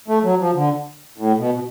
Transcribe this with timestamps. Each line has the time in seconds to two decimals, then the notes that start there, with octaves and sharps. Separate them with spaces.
0.08 A3
0.24 F#3
0.40 F3
0.55 D3
1.18 A2
1.38 B2
1.54 B2